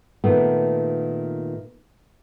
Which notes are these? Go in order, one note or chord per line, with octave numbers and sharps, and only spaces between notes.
A#2 D#3 A3 B3